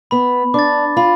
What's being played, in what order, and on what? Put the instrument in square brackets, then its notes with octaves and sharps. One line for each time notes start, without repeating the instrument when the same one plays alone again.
[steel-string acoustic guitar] B3 [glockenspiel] B5
[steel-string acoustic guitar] D4 [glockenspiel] D6 A6
[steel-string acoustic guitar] F4 [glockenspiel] B5